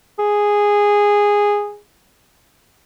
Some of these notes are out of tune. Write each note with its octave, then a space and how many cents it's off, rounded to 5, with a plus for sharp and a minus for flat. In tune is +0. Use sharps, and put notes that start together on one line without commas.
G#4 -10